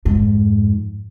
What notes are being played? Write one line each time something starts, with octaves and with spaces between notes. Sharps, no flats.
F2 G#2